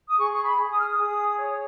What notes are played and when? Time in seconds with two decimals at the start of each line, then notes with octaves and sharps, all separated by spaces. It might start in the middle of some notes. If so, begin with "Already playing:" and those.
0.08 D#6
0.18 G#4 C#6
0.33 C#6
0.44 B5
0.57 G#4
0.71 D#6
0.78 F6
0.85 D#6
0.98 G#4
1.37 C#5